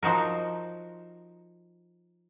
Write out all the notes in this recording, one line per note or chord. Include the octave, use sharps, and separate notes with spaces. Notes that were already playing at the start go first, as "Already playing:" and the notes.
F3 D#4 F#4 A#4